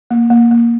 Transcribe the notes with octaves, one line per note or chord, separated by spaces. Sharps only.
A#3
A#3
A#3